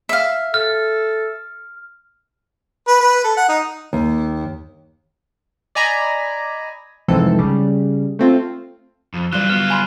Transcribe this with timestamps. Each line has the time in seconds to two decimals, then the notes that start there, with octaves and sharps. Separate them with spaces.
0.09 E5 F5
0.54 A4 F6
2.88 B4
3.00 B4
3.25 A4
3.37 F#5
3.49 D#4
3.93 D#2
5.75 D5 D#5 G#5 A#5 B5
7.08 C2 F2 G#2 E3 C4 A4
7.39 C#3 G3
8.19 A3 C4 F4
9.14 F2
9.33 E3 F#3 G3 F4 F#6 G7
9.49 B3 F4 F6
9.70 G#5 B5 C6